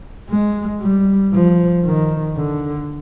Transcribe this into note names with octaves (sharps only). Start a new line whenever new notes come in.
G#3
G3
F3
D#3
D3